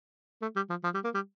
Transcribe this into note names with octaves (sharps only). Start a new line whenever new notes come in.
A3
G3
F3
F3
G3
A#3
G3